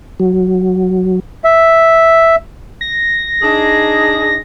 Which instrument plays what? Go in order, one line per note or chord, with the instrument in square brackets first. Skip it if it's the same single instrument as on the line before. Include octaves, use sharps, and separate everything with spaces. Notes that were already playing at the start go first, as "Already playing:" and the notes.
[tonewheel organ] F#3
[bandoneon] E5
[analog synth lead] A#6
[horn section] D4 D#4 G#4